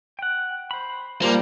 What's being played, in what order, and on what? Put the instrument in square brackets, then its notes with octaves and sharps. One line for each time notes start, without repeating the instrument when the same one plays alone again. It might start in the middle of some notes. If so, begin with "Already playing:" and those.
[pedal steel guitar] F#5 G5
C5 B5
[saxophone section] A#2 F3 G3 [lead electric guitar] A#3